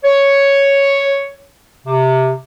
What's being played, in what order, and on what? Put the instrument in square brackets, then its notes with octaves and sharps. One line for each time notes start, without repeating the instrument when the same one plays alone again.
[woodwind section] C#5
C3